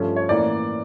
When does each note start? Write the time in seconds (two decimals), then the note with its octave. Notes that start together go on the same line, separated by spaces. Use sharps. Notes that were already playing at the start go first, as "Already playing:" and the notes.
Already playing: G2 F3 A3 C#4
0.16 C#5
0.29 A2 E3 A#3 C#4 D5